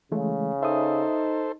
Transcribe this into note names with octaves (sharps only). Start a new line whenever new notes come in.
C#3 E3 G#3 A3
D#4 A4 C5 E5 D#6